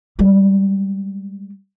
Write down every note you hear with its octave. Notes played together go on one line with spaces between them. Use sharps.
G3 G#3